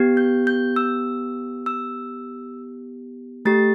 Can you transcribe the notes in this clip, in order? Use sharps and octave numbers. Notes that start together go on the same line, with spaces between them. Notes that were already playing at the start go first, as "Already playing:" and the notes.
Already playing: B3 G4
G6
G6
E6
E6
A3 G4 A6